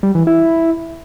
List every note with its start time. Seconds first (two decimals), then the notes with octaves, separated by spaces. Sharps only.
0.03 G3
0.15 E3
0.27 E4